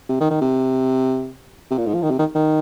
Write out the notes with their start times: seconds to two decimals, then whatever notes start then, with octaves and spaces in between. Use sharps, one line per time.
0.09 C3
0.20 D#3
0.30 D#3
0.41 C3
1.71 C3
1.78 A#2
1.86 G#2
1.94 F3
2.02 D#3
2.10 C3
2.19 D#3
2.35 D#3